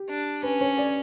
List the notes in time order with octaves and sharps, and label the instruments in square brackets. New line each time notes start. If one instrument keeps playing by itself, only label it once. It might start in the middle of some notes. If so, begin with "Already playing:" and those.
Already playing: [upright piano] G4
[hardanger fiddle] D4
[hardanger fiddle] C#4 [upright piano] B4
[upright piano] C#5
D5